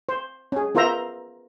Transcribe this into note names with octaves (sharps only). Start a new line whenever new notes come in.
C5
C#4 G#4
B3 F4 A#4 C5 E5 A#5